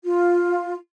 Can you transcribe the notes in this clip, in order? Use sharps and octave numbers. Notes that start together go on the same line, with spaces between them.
F4